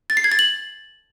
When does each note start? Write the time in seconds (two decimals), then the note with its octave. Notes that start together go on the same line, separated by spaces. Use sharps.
0.10 A6
0.17 C7
0.24 G#6
0.32 A6
0.39 F#7